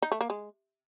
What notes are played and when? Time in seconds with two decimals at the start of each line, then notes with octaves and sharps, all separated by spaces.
0.02 D#4
0.12 A3
0.21 A#3
0.30 G#3